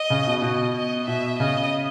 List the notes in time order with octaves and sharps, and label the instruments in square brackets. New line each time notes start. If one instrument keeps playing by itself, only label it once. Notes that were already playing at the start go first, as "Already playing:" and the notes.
Already playing: [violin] D#5
[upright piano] C#3
B2
[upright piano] B2 [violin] D#5
[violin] D#5
[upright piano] B2 [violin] E5
[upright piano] C#3 [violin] D#5